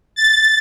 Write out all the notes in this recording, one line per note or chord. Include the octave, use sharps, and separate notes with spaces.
A6